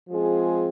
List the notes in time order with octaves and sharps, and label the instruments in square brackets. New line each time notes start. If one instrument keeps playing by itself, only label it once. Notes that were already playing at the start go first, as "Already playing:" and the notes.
[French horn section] F3 G#3 C4 F4 G#4